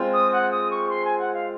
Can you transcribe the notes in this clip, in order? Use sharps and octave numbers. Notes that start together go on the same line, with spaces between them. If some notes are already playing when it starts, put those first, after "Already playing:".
Already playing: G#3 C4 F4
D#6
F#5
D#6
C#6
C6
G#5
F#5
F5